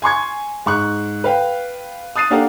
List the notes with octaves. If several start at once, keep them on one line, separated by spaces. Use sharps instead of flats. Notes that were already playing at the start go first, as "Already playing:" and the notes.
G#5 C6 C#6 G#6
G#2 C#6 F#6
B4 F5 G5
D#6 F#6 A6 C7 D#7
A#3 D4 G4 A4 F5 F#5